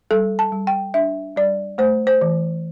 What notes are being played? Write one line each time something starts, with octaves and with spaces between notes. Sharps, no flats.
G3 A4
A5
G3
G5
D4 E5
G3 D5
A3 C5
C5
E3